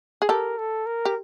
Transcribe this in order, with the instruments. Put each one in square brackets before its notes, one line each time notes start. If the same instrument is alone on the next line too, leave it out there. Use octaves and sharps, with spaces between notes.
[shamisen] G#4
[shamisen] G4 A4 [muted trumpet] A#4
[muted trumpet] A4
A#4
[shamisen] G4